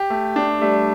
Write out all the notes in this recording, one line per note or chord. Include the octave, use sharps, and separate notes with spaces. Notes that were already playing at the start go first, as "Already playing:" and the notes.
Already playing: G4
A3
D4
G3 A3